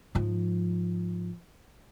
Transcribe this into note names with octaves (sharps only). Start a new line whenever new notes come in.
G#2 F3